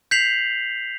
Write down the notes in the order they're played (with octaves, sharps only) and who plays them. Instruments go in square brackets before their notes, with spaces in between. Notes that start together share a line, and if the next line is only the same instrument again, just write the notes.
[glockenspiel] G6 B6 C7 F7 F#7